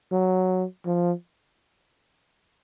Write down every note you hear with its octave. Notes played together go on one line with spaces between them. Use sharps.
F#3
F3